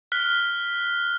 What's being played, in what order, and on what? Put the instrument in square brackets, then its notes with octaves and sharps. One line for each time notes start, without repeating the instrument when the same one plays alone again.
[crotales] F6 F#6 B6 G7